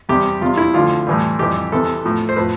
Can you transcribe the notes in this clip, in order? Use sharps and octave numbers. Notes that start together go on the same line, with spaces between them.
E2 C3 G3 G4
E2 C3 G3 F4
E4
D2 D3 F3 F4
A2 E3 G3
F2 C3 E3 G3 G4
E2 C3 E3 A4
A2 F3
C5
A2 F3 B4